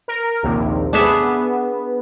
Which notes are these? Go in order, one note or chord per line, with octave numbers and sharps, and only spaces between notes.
A#4
A#1 D#2 C3
B3 D4 G#4 E5